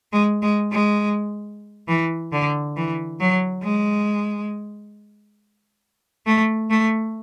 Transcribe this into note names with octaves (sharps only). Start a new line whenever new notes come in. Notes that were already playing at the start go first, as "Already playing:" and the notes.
G#3
G#3
G#3
E3
D3
E3
F#3
G#3
A3
A3